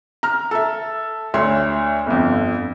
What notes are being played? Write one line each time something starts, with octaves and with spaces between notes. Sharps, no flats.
A#5 F6
A4 E5
D2 C#5 E5 C6
G1 F2